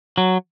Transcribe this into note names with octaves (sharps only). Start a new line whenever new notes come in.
F#3